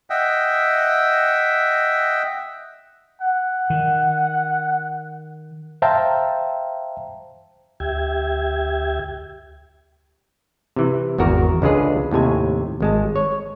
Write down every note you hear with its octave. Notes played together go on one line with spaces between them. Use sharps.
D#5 E5 F#5 G5
F#5
D#3
C5 E5 F5 G5 A5 A#5
D2 G4 E5 G5 G#6
C3 E3
G#1 E2 F#4 A#4
C#2 D3 G#3 F4 G#4 B4
D#2 A2 C3 G#5
G#1 G#3 A5
C#5